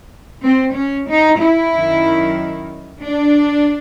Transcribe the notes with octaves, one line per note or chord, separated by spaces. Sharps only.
C4
C#4
D#4
E4
F#2 D#3
D4